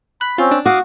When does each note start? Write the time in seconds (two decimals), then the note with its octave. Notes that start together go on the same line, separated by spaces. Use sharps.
0.21 B5 F#6
0.38 C4 C#4 F4
0.51 D4
0.66 F#4 F5 D6 D#6